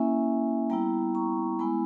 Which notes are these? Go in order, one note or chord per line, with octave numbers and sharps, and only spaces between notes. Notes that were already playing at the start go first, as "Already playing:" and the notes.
Already playing: A#3 C#4 E4 E5 G#5
G3 B3 E4 G5 A#5
A#5 C#6
G#3 B3 E4 G#5 B5